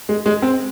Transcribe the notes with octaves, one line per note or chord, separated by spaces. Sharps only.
G#3
G#3
C4